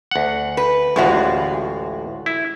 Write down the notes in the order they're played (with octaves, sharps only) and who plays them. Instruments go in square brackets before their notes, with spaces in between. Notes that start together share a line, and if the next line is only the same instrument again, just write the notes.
[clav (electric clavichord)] D2 F#5
[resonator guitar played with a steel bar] B4
[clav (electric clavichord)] A1 D2 A2 [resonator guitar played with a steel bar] G#3 F4 F#4
[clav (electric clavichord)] E4